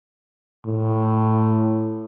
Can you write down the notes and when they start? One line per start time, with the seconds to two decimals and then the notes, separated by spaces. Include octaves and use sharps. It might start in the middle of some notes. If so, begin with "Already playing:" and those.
0.66 A2